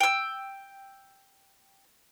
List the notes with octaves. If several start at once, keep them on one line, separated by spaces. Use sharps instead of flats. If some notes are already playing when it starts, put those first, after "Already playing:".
G5 E6